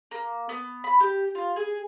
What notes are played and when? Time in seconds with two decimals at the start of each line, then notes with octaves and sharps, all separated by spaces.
0.11 A#3
0.49 B3
0.84 B5
1.00 G4
1.35 F4
1.56 G#4